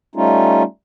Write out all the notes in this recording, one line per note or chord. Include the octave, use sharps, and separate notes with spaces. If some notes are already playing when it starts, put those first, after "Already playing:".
G3 A3 C#4 D#4 F4